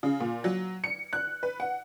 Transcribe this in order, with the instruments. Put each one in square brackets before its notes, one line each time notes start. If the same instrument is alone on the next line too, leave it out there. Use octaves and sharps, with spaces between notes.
[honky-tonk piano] C#3
A#2
F#3
C#7
F#6
B4
F#5